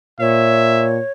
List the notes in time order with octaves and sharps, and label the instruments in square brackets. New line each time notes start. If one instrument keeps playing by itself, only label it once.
[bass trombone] A#2 [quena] C#5 [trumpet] E5